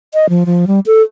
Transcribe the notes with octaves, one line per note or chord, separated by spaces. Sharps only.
D#5
F3
F3
G3
A4